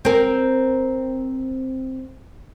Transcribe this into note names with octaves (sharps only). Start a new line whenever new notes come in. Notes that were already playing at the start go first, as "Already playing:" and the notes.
C4 A#4